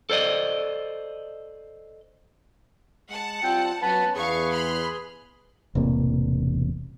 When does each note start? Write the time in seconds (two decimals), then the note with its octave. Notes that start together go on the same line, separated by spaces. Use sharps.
0.10 A4 C5 D5 D#5
3.10 G#3 F#5 A5
3.43 G3 C4 F4 G5
3.82 F#3 B3 C#4 B4 F#5 A5 B5
4.16 E2 G#4 B4 F5 C#6
4.51 B5 C6 F6
5.75 E1 A1 C3 A#3